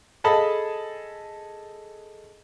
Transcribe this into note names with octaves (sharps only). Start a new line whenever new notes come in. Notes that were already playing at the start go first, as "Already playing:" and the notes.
G#4 A4 D#5 A5 B5